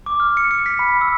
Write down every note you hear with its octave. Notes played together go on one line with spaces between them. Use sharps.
D6
F6
C#7
C#7
B6
B5
E6